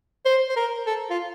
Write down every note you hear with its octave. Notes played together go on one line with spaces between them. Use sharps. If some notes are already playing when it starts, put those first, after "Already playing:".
C5
C5
A#4
A4
F4